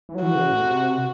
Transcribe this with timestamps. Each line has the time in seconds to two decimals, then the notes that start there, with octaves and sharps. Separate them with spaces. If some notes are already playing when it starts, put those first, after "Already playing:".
0.09 E3
0.15 F#3
0.22 E3 F#4
0.35 C#3
0.50 A2
0.62 C3